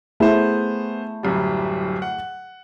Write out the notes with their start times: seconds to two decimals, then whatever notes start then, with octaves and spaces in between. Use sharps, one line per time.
0.20 A3 B3 E4 G#4 C5
1.23 D1 F#2 G3
2.02 F#5